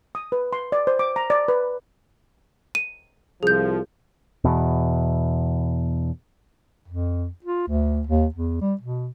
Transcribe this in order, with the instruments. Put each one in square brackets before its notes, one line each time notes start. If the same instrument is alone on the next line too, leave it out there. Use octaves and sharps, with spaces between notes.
[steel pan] D#6
B4
C6
D5
C5
D6
A#5
D5
B4
[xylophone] D#7
[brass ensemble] C2 F3 [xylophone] G#4 G6
[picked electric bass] E2 B2
[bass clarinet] F2
F4
D2
D#2
E2
G3
B2